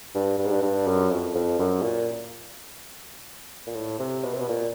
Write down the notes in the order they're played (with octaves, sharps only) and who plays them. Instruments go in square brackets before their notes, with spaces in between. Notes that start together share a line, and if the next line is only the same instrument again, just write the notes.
[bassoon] G2
G2
G#2
G2
G2
F#2
F2
F2
F#2
A#2
A#2
A2
C3
B2
C3
B2
A#2